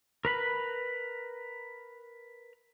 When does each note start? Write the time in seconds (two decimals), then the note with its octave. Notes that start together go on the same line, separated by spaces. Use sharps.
0.25 A#4 B4 B5